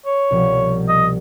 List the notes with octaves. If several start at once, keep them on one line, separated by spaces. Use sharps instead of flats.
C#5
C2 B2 F3
D#5